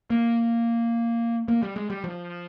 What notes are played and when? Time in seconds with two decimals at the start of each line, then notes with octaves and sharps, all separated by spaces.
0.10 A#3
1.48 A#3
1.63 G3
1.76 G#3
1.90 G3
2.04 F3